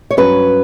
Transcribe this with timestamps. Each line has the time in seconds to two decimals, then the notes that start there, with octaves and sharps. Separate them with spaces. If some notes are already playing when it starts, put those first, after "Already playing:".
0.11 C#5
0.17 G2 F#3 C#4 B4